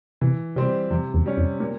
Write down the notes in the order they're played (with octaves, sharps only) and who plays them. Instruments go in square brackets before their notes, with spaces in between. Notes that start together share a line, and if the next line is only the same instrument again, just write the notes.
[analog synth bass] C3 [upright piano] E3
[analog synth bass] C3 [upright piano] G3 C4 G4
[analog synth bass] F2 [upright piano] C3
[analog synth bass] E2
[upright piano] G3 C#4
[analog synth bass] F2
[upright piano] A#2